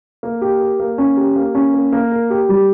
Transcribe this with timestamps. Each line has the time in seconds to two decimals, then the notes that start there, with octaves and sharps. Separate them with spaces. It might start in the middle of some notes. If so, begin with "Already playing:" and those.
0.23 A#3
0.42 G4
0.60 A#4
0.80 A#3
0.98 C#4
1.17 G4
1.36 A#3
1.55 C#4
1.74 A#3
1.93 A#3
2.12 A#4
2.30 G4
2.49 G3